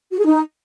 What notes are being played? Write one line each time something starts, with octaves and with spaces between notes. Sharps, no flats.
F#4
G#4
D#4